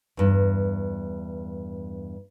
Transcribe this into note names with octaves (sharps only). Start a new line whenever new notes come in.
E2 G2